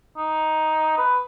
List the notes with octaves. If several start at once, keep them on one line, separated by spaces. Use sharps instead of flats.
D#4
B4